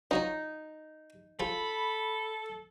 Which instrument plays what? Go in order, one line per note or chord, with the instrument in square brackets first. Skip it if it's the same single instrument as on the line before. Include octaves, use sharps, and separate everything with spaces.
[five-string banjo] D#4 [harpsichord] F4 F#4 C#5
[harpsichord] F4 G#4 C5 [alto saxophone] A4 [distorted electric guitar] B5